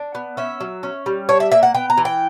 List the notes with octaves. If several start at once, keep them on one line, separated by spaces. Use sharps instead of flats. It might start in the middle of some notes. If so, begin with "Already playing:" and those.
Already playing: D4
B3
C#4 E5
F#3
C#4
G3
D4 C#5
E5
A#3 E5
F#5
B3 G5
A#5
E3
G5